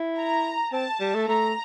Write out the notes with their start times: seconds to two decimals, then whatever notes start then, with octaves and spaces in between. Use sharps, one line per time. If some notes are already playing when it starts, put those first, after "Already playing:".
Already playing: E4
0.17 A#5
0.73 C4 A5
1.00 G3
1.14 A3
1.28 A3 A#5